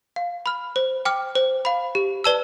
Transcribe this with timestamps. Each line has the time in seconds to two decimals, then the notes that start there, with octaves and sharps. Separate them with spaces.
0.16 F5
0.46 B5 F6
0.76 C5
1.05 G5 D6 F6
1.35 C5
1.65 F5 B5
1.95 G4
2.24 B4 D5 A5 E6